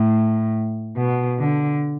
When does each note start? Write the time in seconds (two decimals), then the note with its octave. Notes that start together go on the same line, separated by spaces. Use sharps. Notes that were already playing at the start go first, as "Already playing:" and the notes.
Already playing: A2
0.97 B2
1.39 D3